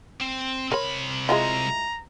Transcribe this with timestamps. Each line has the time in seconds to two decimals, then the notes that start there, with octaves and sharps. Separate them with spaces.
0.21 C4
0.72 C2 A#4 C#5 B5
1.29 G#3 E4 F4 A#5